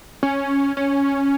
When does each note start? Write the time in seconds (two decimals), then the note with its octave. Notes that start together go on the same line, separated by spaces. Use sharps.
0.23 C#4
0.77 C#4